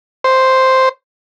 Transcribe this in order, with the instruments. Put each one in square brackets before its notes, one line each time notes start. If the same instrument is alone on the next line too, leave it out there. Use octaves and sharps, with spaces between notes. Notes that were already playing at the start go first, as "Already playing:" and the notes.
[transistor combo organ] C5